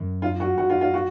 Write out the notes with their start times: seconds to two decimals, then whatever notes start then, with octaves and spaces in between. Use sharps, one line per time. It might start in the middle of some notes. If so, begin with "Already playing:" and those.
Already playing: F#2
0.22 F4
0.40 F#4
0.58 F#2 F#4
0.70 F4
0.81 F4
0.94 F#4